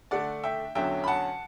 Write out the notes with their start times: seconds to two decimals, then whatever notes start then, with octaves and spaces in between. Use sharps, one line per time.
0.11 D3 A3 D4 D5 F#5
0.44 E5 G5
0.75 E2 D3 F#3 C#4 E5 G5
1.04 B5
1.07 F#5 A5